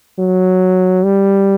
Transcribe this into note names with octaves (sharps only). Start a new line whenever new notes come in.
F#3
G3